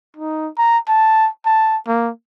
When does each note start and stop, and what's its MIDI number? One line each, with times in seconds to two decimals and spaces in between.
0.17 0.48 63
0.58 0.78 82
0.88 1.28 81
1.46 1.77 81
1.87 2.10 58